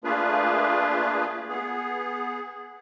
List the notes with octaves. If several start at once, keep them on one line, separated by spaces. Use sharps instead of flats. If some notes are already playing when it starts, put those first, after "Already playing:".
A3 A#3 D4 F4 G#4 B4
B3 G#4